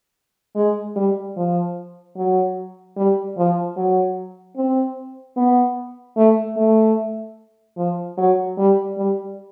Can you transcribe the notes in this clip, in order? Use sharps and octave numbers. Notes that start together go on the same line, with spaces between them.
G#3
G3
F3
F#3
G3
F3
F#3
C4
B3
A3
A3
F3
F#3
G3
G3